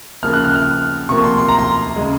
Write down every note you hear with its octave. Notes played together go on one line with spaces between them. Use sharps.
C#3 F3 A#3 F6
F#6
F6
F6
C3 F3 A#3 C#6
C6
C6
A#5
C6
C#3 G#3